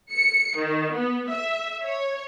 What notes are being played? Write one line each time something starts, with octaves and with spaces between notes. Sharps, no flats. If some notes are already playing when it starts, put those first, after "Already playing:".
C#7
D#3
B3
E5
C#5